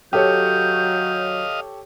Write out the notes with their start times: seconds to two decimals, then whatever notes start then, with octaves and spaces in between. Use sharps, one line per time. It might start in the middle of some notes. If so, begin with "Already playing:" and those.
0.13 F#3 G4 A4 C#5 D#5 F5 G6